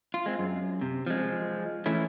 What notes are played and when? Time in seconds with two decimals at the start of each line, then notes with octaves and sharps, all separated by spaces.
0.14 F4
0.26 G#3 C4
0.39 F#2
0.81 C3
1.07 F3 G#3
1.86 E3 A3 C#4 E4